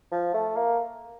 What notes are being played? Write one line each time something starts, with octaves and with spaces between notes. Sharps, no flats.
F3
A3
A#3